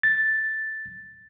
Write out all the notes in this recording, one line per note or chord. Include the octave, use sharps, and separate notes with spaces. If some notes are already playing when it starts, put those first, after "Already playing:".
A6